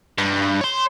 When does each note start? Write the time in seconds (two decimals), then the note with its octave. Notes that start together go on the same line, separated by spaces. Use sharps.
0.18 G2
0.61 C#5 C6